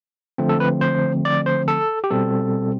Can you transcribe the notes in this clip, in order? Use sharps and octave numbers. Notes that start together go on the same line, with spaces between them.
D3 F3 A3 C4
A4
B4
C5
D5
C5
A4
G4
B2 G3 C4 A4